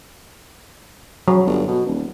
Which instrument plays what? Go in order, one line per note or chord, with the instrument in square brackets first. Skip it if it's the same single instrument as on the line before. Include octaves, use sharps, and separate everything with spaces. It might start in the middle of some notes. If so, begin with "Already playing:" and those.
[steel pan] F#3
[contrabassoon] G1
B2
D#1